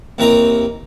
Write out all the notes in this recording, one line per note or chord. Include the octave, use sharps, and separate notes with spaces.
D#2 E3 C4 A#4 A#5